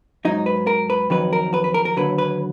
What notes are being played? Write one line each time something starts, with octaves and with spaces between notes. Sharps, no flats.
G#2 F#3 D#4
B4
A#4
B4
F2 D#3 F#3 B4
A#4
B4
B4
A#4
A#4
D#2 D3 F#3 B4
B4